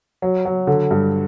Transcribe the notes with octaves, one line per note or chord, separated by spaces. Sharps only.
F#3
F#3
D3
G2